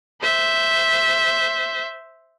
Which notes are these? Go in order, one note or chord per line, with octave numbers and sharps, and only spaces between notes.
C5 E5